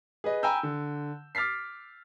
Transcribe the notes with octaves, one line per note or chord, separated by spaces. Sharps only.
G#4 B4 D#5
G5 G#5 A#5 B5 E6 G6
D3
D6 F6 A6 B6 C7